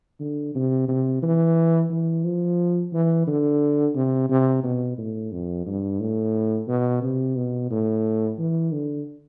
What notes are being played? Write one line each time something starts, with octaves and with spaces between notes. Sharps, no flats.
D3
C3
C3
E3
E3
F3
E3
D3
C3
C3
B2
A2
F2
G2
A2
B2
C3
B2
A2
E3
D3